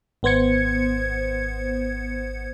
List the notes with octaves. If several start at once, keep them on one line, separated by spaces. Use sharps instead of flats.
G#1 B3 C5 G#6 C#7